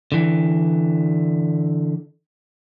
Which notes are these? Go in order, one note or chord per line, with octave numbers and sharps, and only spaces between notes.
D3 E3